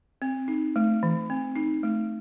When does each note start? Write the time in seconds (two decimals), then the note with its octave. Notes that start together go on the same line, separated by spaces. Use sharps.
0.22 C4
0.48 D#4
0.76 A3
1.03 E3
1.30 C4
1.56 D#4
1.83 A3